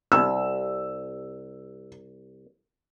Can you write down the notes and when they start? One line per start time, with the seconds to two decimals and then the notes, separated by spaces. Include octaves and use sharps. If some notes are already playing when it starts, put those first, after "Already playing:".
0.12 C2 E6